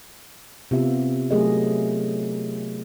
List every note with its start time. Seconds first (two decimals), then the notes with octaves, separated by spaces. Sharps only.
0.71 C3 B3 F4 G4 E5
1.31 F#3 A3 G4 G#4 A#4 D#5